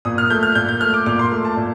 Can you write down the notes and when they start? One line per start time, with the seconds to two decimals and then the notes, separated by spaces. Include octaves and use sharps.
0.05 A#2 D#6
0.18 F6
0.30 A3 G6
0.43 F6
0.55 A#2 G6
0.69 G6
0.81 A3 F6
0.94 D6
1.06 A#2 D6
1.19 C6
1.31 A3
1.45 A5
1.57 A#2